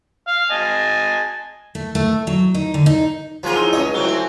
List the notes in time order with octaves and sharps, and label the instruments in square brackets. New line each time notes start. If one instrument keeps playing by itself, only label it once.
[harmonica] F5
D#5 G#5 A5
[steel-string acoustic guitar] A3
A3
F#3
D#4
D3
D#4
[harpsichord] F3 G#4 [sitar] F#3 A#3 F4 [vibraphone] F5
[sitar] D#4 [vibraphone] E4 C#5
[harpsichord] C#2 D#6 [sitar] C#5 D#5 [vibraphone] F5
[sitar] F#3 A3 C4 [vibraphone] E4 F#4
[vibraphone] G#5